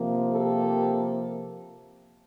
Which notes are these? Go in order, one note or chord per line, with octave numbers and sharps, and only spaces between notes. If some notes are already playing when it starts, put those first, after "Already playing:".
Already playing: C3 F3 A#3
G4 A4